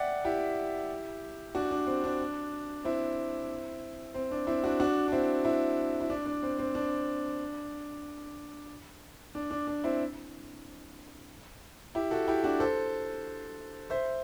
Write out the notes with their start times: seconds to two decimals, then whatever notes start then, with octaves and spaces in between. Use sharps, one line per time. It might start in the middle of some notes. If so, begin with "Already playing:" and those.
Already playing: D5 E5 F#5 G5
0.25 E4 G4
1.55 D4 F#4
1.71 D4
1.87 C4
2.04 D4
2.84 C4 E4
4.14 C4
4.32 D4
4.47 C4 E4
4.64 D4 F#4
4.80 D4 F#4
5.08 D4
5.12 C4 E4
5.45 C4 E4
6.01 E4
6.10 D4
6.26 D4
6.43 C4
6.59 C4
6.75 D4
9.35 D4
9.51 D4
9.67 D4
9.84 C4 E4
11.95 E4 G4
12.11 F#4 A4
12.28 E4 G4
12.43 D4 F#4
12.60 A4 C5
13.90 C5 E5